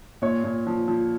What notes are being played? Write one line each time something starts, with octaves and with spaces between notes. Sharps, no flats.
A#2 C#5
A#2
F3
F3